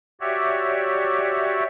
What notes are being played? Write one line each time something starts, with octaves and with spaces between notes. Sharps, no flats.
F#4 G4 C#5 D5 E5